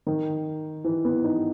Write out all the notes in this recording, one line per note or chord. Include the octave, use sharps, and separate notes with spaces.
D#3
E3
B3
D#4